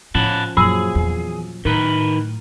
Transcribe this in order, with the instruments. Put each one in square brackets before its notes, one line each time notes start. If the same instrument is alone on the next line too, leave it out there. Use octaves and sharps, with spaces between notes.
[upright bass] A2 [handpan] F3 C#4 F4 [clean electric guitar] F#5 A5 B5
[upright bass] F#2 [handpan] A#2 F3 F#3 [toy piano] F4 F#4 E6 [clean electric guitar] G#4
[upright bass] E2
[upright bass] A2 [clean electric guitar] D#3 B4 [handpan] A#4